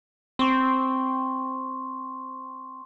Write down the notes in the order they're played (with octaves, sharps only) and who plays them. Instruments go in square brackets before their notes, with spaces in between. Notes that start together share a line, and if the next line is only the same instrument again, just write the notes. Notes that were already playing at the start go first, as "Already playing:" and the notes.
[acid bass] C4 [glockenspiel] C6 C#6